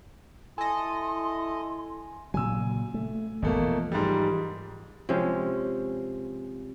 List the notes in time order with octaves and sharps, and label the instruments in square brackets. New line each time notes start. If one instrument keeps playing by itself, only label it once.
[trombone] E4 [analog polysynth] A4 D#5 [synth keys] G#5 [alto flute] C6
[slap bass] A#2 C#3 F#3 [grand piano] G#5 E6
[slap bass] A3
[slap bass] G#1 E2 [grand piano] B2 A3 A#3
[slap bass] E3 F3
[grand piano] G#2 G3
[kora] C3 F3 G#3 C#4